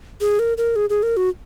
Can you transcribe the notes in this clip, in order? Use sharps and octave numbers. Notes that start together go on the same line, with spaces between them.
G#4
A#4
A#4
G#4
G#4
A#4
F#4